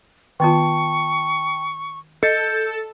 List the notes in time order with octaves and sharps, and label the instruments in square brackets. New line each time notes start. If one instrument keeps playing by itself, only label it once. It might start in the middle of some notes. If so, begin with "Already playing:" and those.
[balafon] D#3 B3 F4 [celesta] G5 A5 [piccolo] C#6
[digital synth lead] A4 [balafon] D#5 [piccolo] G6 [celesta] A6 C#7